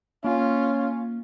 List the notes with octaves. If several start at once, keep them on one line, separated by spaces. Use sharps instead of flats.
A#3 C#4 F4